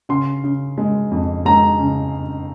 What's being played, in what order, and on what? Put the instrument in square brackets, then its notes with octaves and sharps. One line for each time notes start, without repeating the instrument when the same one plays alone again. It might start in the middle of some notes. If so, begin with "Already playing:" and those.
[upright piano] C#3 C6
C#3
G#3
F2
G#3 A#5
C#3